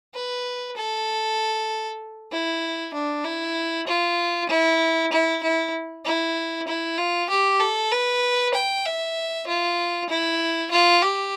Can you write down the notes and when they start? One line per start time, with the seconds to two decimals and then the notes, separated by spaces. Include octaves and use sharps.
0.14 B4
0.76 A4
2.32 E4
2.93 D4
3.24 E4
3.87 F4
4.49 E4
5.12 E4
5.43 E4
6.05 E4
6.67 E4
6.98 F4
7.30 G4
7.60 A4
7.91 B4
8.54 G5
8.85 E5
9.47 F4
10.09 E4
10.71 F4
11.02 G4